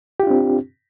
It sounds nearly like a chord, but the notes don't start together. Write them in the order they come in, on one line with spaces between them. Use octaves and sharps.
G4 F4 D4 C4